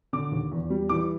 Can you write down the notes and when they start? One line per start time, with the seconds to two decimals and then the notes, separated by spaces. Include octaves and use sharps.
0.13 D3 D6
0.32 D#2
0.52 E2
0.70 G3
0.89 E3 D6